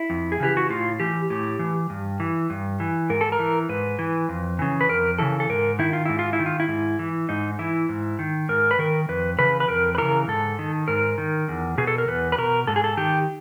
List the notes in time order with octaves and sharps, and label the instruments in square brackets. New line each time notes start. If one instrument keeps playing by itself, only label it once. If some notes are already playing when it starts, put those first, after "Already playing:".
Already playing: [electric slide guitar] E4
F2
G#4
C#3 E3 G4
F#4
A2 F4
E3 G4
A2 G4
E3
G2
E3
G2
E3
G#2 A#4
A4
A#4
E3
G#2 B4
E3
F2
C#3 E3
B4
F2 A#4
C#3 E3 A4
A4
G#2 A#4
D#3 E4
F4
G#2 E4
F4
E4
D#3
F4
E4
G#2
E3
G#2 D#4
E3 E4
G#2
D#3
G#2 A#4
B4
D#3 A#4
F2 B4
C#3 E3 B4
B4
F2 A#4
B4
C#3 E3 A#4
G#2 A4
D#3
G#2 A#4
D#3
E2
B2 G#4
A4
A#4
E2 B4
B4
B2 A#4
G#2 A4
G#4
A4
D#3 G4